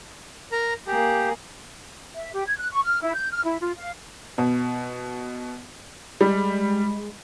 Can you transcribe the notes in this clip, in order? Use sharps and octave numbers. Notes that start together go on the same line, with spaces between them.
A#4 A#5
A#3 G4 G#4
E5
G4
G#6
F#6
C#6
F6
E4
G6
F6
E4
F4
F5
B2
G3 G#3